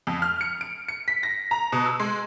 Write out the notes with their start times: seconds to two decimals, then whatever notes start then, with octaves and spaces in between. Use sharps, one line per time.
0.07 F2
0.22 F6
0.41 C#7
0.61 D7
0.88 C#7
1.08 B6
1.23 A#6
1.51 A#5
1.72 B2
1.85 E6
2.00 G#3